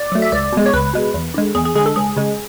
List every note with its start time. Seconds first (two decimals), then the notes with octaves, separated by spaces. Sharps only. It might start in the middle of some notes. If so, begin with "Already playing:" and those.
Already playing: D5
0.12 F#3 A3
0.22 E5
0.32 C#2 D5
0.53 B2 G#3
0.66 C#5
0.74 C#2 B4
0.93 B2 G#3
1.14 E2
1.34 D3 G#3
1.55 E2 G#4
1.65 G#4
1.75 D3 G#3 G#4
1.86 A4
1.96 C#2 G#4
2.16 C#3 G#3